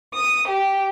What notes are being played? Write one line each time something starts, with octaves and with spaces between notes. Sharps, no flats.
D#6
G4